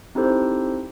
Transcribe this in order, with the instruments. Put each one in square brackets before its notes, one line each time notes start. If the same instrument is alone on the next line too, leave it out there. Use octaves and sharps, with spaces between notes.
[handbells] C4 D#4 E4 G4 A4 C5